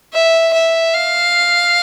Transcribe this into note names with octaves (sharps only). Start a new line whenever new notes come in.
E5
E5
F5